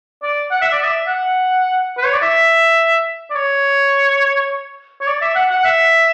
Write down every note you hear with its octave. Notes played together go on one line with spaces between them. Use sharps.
D5
F#5
E5
D5
E5
F#5
B4
C#5
D5
E5
D5
C#5
C#5
D5
E5
F#5
F#5
E5